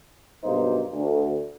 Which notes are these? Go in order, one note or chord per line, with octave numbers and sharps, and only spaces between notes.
B1 G2 B2 A#3 D#4 C5
D2